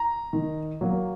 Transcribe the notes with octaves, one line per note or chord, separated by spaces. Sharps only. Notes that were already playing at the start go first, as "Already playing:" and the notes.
Already playing: A#5
D#3
F#3 A#3